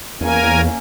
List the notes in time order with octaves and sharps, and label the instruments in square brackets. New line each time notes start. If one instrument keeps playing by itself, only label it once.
[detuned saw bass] E2 [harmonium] A#3 C#4 [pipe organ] A#4 G#5